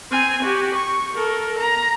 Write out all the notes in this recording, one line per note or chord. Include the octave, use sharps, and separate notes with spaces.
C4 G#5
F#4 G4
C#6
A4 A#4
A#5